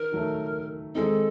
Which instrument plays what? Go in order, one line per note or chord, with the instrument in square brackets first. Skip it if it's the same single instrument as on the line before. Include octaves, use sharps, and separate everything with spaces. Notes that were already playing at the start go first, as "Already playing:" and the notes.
Already playing: [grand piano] D#3 [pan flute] A#4
[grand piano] D#3 F#3 A3
[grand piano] D#3 G#3 C4 D#4 [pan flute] A4